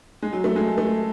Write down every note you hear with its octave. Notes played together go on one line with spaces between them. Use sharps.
G#3
F#3
A3
G#3
A3